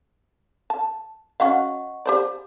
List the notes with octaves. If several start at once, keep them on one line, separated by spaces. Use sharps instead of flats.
A5
C#4 F#4 D#5 F5 F#5 C#6
G4 C5 D5